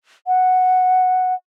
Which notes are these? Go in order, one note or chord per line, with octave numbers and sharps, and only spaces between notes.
F#5